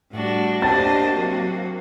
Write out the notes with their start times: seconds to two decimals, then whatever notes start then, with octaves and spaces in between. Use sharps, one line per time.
0.11 A2 G3 D4 F#4
0.62 A#3 D4 G4 C5 D#5 A5 A6
1.14 C3 F#3 A#3 F#4